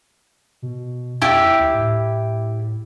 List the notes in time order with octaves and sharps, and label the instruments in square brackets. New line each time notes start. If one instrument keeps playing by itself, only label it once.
[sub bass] B2
[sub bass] F2 [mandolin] E4 G4
[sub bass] D2
A2